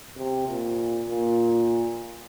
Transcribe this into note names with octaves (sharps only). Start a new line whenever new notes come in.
C3
A#2
A#2